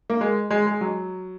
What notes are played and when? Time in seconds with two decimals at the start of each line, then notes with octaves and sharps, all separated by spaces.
0.10 A#3
0.21 G#3
0.51 G#3
0.67 G#3
0.81 F#3